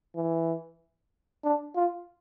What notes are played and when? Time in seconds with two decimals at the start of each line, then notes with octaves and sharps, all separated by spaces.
0.16 E3
1.44 D4
1.76 F4